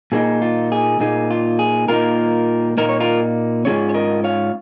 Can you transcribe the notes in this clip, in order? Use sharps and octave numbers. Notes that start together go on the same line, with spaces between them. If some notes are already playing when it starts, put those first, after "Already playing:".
A#2 A#3 D#4 G#4
F4
G#4
A#2 A#3 D#4 G#4
F4
G#4
A#2 A#3 D#4 F4 A#4
A#2 A#3 D#4 A#4
C#5
F4 A#4
G#2 F3 C#4 F4 G#4 C#5
C#5
A#4 D#5
C#5 F5